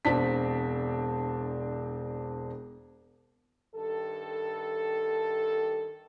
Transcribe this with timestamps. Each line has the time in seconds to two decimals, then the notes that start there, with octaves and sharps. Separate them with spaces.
0.05 E1 C4 D4 B6
3.75 G2 D#3 A4